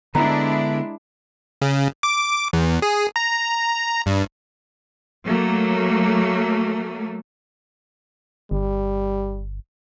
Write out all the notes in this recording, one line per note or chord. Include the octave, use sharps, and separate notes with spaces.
D3 G#3 B3 D4 E4 A#5
C#3
D6
E2
G#4
A#5
G2
F#3 A3 A#3
G1 G3